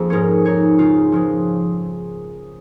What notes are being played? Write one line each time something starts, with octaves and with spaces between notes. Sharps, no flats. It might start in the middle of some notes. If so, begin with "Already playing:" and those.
Already playing: F2 F3 A#3 D#4 G#4
G#2 G#3 C#4 A#4 C#5
G#3 D#4 G#4 C#5
C#3 G#3 F4
C#3 F3 G#3